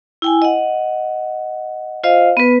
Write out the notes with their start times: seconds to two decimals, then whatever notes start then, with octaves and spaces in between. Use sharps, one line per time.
0.22 E4 G5 G#5
0.42 D#5 F#5
2.04 F4 C5 D#5 F5
2.37 B3 B4